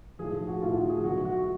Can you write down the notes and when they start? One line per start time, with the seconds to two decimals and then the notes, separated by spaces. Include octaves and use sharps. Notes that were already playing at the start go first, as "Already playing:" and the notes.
0.19 B1 A2 F3 G#4
0.33 G#4
0.47 F#4
0.62 B1 A2 F3 F4
0.75 F#4
0.90 G#4
1.04 B1 B2 F#3 A3 F#4
1.25 F#4